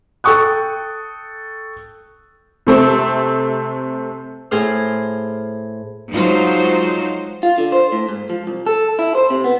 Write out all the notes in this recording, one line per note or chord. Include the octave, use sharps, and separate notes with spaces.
A4 G5 C#6 D#6 F#6
C3 A3 C4
A2 G#4 C5 F6
F3 F#3 G#3 D#4 F4 C5
F4
D3
C5
A2
G#2
F3
C2
A4
E4
C5
C3
B3